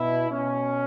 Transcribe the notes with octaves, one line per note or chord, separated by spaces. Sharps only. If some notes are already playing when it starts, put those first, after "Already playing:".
Already playing: B2 E4
B2 C#4